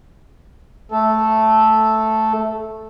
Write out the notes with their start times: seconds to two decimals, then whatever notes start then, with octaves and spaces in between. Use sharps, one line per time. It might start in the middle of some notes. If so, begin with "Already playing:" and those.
0.92 A3 A4